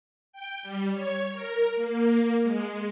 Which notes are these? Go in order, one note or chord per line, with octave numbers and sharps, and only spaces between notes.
G5
G3
C#5
A#4
A#3
G#3